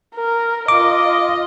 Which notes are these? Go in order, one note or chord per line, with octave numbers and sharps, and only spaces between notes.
A#4
F4 D#5 D6